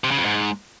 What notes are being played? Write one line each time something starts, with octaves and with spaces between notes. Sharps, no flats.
C3
C#3
F2
G#2